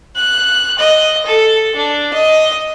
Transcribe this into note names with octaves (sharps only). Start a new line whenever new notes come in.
F#6
D#5
A4
D4
D#5